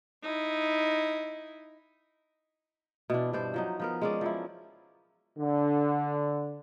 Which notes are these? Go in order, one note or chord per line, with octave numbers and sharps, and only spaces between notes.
D#4 E4
B2 E3 D4
G2 B2 C5 D5
F3 F#3 D#4
F3 B3 A#4
G#3 C#4 D5
F3 F#3 E4
D3